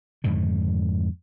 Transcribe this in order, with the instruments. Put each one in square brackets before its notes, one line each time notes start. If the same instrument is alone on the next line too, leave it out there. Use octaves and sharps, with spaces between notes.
[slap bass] F2 G#2 D3 D#3